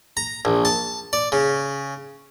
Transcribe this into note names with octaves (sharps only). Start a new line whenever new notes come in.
A#5
A#1
A5
D5
C#3